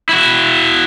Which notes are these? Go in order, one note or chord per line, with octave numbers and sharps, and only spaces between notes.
E4 F#4